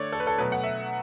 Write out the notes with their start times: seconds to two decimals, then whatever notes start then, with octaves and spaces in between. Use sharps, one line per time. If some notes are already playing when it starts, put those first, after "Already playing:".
Already playing: D3 A3 C#5 D5
0.12 A4
0.20 B4
0.27 A4
0.38 B2 F#3 A3 B4
0.52 F#5
0.64 E5